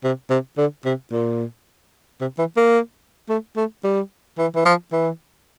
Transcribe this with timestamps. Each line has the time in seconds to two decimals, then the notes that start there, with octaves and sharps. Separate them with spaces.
0.04 C3
0.30 C3
0.58 D3
0.85 C3
1.12 A#2
2.21 C3
2.38 E3
2.57 A#3
3.29 A3
3.56 A3
3.84 G3
4.38 E3
4.56 E3
4.65 F3
4.92 E3